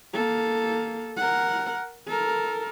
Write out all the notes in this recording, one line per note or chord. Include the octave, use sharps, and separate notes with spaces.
A#3 A4
A#4 F#5
A4 A#4